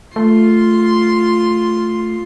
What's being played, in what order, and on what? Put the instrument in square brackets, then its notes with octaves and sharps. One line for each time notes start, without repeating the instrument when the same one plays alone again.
[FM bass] A3 [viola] F4 C6